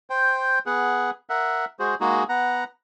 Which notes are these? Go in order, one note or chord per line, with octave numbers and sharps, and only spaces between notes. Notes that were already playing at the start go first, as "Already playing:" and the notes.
C5 G5
B3 G#4 F#5
A#4 E5 F#5
G#3 F#4 G#4 C5
G#3 A#3 D#4 F#4 G#4
B3 F#5 A#5